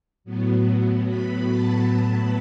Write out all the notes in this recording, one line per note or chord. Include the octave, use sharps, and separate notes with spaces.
A2 F#3 B3
B5
A5
B5